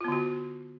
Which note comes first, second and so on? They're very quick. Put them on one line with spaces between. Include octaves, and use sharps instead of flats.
F4 B3 D3 F#4